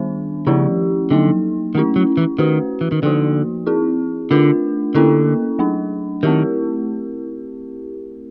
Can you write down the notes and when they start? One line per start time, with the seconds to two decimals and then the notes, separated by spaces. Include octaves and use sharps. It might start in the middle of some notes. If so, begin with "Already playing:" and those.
Already playing: D#3 G3 B3 D4
0.47 C#3 F3 A3 C#4 E4 G4
1.11 D3 F#3 A#3 D#4
1.75 D#3 A3 C#4 E4
1.96 F#3
2.17 E3
2.39 D#3 A3 C#4 F#4 B4
2.81 E3
2.92 D#3
3.02 D3 F3 A#3 D#4 F#4
3.66 C4 E4 G#4
4.30 D3 A3 D4 F4 A#4
4.95 D3 A#3 C#4 E4 A4
5.59 F#3 A3 D4
6.23 D#3 A3 C4 E4 G4 A#4